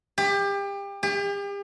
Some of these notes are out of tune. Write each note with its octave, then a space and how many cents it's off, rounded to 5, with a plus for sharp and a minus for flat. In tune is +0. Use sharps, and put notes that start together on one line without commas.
G4 +30
G4 +40